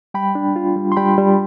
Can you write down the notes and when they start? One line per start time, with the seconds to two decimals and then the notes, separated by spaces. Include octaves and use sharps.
0.14 G3 G5 B5
0.35 D4
0.56 F4
0.76 G3
0.92 C6
0.97 G3 G5 B5
1.18 G3